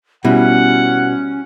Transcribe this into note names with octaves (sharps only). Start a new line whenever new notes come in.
B2 G3 C#4 E4 F#5